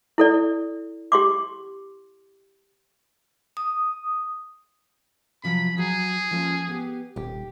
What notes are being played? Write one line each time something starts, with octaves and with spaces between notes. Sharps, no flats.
E4 A4 D5
G4 C6 D6
D#6
C3 F3 F#3 B5
F#3 G#4
F3 A#3 C#4
B3 G4
D#1 G4